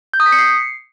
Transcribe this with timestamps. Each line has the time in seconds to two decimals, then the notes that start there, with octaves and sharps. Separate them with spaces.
0.14 G6
0.20 D#6
0.26 B6
0.32 C#7
0.39 C7